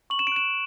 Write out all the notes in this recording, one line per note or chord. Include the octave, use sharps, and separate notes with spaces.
C#6 F#7
E7
D7
F#6 E7